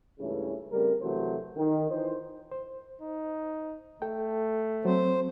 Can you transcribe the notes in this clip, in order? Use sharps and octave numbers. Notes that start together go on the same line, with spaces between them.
C#2 G2 C#3 E3 A3 C#4
C#3 G3 A3 C4 A#4
C3 E3 F#3 A3 C5
D#3
E3 D#4 F4 C5
C5
D#4
A3 A4 G5
F#3 C4 C5